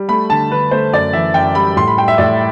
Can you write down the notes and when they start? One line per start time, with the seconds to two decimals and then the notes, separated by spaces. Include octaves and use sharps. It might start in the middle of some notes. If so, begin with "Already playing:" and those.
Already playing: G3
0.09 A3 B5
0.30 D3 A5
0.50 D3 B4
0.71 A3 C5
0.93 F#2 D5
1.13 E3 E5
1.34 F#2 G5
1.55 G3 B5
1.76 A2 C6
1.88 B5
1.98 G3 G5
2.08 E5
2.18 A2 D5